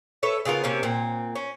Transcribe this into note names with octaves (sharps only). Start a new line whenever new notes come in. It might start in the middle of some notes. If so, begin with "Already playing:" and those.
A4 B4 C#5 E5
C#3 B3 F4 A#4
C3 A#3 C4 C#4
A#2 C4
C#4